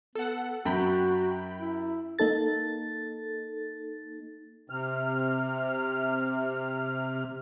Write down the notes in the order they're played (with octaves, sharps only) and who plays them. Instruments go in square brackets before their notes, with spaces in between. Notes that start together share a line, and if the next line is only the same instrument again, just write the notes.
[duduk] B3 [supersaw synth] A4 F#5
[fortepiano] F#2 [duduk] F#4 [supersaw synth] G5 B5
[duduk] E4
[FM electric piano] A#3 D#4 A4 A6
[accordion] C3 F6